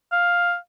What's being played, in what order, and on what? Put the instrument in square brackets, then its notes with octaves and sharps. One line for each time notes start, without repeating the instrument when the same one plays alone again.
[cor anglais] F5